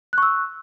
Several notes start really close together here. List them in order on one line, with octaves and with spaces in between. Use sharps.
F#6 C#6 E6